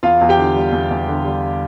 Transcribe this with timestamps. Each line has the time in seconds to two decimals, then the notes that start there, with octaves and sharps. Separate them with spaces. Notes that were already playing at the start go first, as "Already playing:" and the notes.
0.03 E2 F4 F5
0.21 E2
0.29 G4 G5
0.38 D3
0.56 G3
0.72 E2
0.91 E2
1.08 D3
1.24 G3